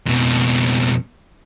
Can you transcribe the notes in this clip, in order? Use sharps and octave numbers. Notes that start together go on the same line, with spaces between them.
F2 B2